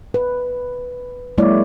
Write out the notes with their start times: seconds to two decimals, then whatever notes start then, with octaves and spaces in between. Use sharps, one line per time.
0.14 B4
1.38 F#3 G#3 A#3 E4 C#5 D5